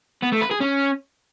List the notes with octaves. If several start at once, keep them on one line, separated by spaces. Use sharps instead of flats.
B3
A3
B4
G#4
C#4